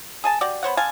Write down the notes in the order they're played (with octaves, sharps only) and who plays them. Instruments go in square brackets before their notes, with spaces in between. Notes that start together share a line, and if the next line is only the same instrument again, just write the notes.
[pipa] G#4 G#5 A5
F#4 G4 D5
B3 C5 C#5 F#5
D3 F5 G#5 A5